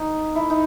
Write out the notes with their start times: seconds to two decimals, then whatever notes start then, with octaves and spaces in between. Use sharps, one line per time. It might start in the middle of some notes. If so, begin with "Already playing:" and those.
Already playing: D#4
0.35 E4
0.50 D#4